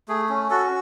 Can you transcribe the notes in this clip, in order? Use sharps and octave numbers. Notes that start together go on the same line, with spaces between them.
A3 G#4
C#4
F#4 A4